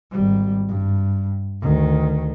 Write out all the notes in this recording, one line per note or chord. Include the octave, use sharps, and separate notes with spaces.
G#1 G3
G2
D2 D#3